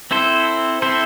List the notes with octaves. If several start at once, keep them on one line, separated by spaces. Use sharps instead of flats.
C4 E4 A4 C5
C4 E4 A4 C5